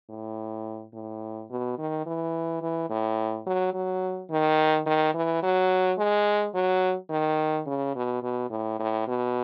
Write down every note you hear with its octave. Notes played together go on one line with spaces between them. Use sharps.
A2
A2
B2
D#3
E3
E3
A2
F#3
F#3
D#3
D#3
E3
F#3
G#3
F#3
D#3
C#3
B2
B2
A2
A2
B2